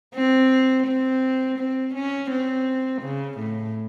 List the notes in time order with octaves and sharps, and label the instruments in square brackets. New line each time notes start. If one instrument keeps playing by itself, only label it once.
[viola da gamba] C4
C4
C4
C#4
C4
C#3
A2